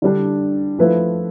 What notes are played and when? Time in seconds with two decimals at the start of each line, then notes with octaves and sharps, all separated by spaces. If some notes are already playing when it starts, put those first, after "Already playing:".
0.02 D3 G3 D4
0.79 F3 A3 E4 B4